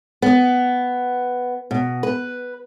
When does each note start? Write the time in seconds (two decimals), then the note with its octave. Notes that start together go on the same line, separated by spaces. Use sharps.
0.22 B3
1.71 B2
2.03 B4